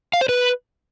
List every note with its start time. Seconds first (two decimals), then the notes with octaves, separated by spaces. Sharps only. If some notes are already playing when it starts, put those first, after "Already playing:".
0.14 F5
0.21 C5
0.29 B4